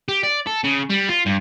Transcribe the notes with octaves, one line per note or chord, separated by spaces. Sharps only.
G4
D5
A4
C#3
G3
F4
G2